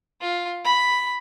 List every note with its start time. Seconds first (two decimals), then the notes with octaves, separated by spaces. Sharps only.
0.21 F4
0.64 B5